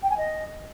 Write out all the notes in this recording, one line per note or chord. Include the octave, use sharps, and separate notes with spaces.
G5
G#5
D#5